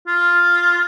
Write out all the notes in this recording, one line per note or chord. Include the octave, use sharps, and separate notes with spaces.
F4